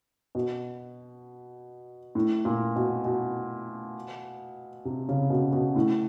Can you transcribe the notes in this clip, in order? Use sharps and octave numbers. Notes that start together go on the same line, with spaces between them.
B2
A2
A#2
B2
B2
C3
C#3
B2
B2
A2